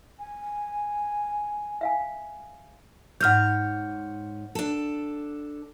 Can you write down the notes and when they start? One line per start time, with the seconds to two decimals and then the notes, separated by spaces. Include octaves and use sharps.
0.19 G#5
1.81 E5 F5 G#5
3.21 G#2 C#5 F#5 F6 G6
4.55 D4 A4